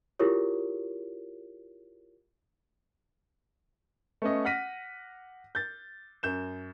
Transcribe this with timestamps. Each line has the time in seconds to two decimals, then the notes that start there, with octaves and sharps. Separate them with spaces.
0.19 E4 F4 G4 G#4 A#4 C#5
4.22 A3 B3 C#4 D#5
4.45 F#5 F6 A#6 B6 D#7
5.55 G6 A6
6.23 F#2 G6 E7